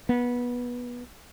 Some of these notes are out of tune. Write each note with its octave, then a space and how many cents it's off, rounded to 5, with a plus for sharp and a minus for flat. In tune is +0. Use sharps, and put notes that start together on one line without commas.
B3 -20